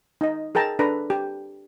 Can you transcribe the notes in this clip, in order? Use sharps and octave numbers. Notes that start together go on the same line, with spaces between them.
D#4 D#5
G#4 A#4 G5 A5 A#5
D4 A4 B4 A#5
G4